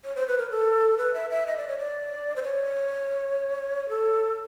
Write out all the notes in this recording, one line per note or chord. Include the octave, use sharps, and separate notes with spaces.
C#5
C5
B4
A#4
A4
B4
E5
E5
D#5
D5
C#5
D5
C5
C#5
A4